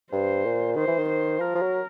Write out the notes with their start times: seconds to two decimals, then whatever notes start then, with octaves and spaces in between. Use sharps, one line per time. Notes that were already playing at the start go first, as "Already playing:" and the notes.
0.12 G2 C5
0.45 A#2
0.76 D#3 C5
0.88 E3
0.99 D#3
1.08 C5
1.39 F3 A#4
1.55 F3
1.62 F#3